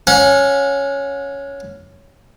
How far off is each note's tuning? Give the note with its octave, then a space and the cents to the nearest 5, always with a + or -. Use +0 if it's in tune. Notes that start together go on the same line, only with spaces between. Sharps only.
C#4 +0 F#5 -35